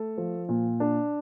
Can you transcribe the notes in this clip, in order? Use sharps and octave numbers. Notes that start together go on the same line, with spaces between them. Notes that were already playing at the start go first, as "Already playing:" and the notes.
Already playing: A3 A4
F3
A#2
D4